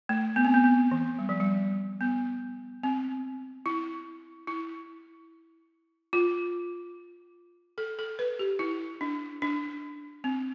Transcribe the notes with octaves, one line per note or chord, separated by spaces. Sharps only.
A3
B3
C4
B3
B3
E3
G3
F3
G3
B3
C4
E4
E4
F4
A4
A4
B4
G4
E4
D4
D4
C4